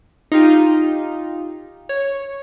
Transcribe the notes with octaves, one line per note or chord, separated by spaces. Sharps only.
D#4 F4 G4
C#5